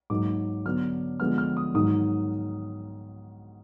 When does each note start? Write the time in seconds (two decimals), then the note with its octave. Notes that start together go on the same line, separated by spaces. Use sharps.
0.10 G#2 F#3 A#3 D#4 D6
0.65 D3 F#3 B3 D4 F6
1.20 D3 F3 G#3 B3 F6
1.38 F6
1.57 D#6
1.74 G#2 D#3 F#3 D#6